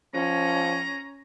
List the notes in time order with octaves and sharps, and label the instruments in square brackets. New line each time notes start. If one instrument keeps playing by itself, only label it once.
[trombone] F3 [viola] C#4 [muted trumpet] A#5